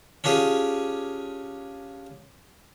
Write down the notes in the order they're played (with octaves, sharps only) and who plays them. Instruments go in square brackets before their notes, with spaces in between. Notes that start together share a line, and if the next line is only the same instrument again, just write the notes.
[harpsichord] C#4 D4 F4 G4 G#4